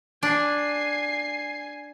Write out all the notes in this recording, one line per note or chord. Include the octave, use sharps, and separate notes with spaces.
D4 G#5 C7